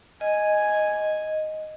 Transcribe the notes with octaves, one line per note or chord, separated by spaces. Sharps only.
D#5 G#5